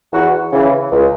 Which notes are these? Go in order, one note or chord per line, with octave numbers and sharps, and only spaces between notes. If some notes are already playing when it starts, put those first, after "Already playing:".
E2 F#4
C#3 E3
C#2